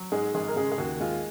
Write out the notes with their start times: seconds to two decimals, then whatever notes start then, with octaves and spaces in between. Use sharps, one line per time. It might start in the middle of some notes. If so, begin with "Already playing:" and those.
Already playing: F#3
0.12 G#2 G#3 G#4
0.34 G#1 G#3 G#4
0.48 A#4
0.56 C#3 G#3 G#4
0.72 G#4
0.78 D#2 F#4
1.00 G#3 F4